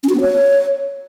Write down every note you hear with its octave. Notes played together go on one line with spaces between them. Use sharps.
C#4
F#4
B3
C#5